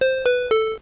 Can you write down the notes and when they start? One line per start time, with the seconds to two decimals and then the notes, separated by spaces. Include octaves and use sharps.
0.01 C5
0.26 B4
0.51 A4